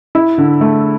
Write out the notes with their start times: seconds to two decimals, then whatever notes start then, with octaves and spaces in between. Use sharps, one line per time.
0.15 E4
0.38 D3
0.61 A3